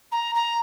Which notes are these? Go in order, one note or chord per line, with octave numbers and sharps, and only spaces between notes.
A#5
A#5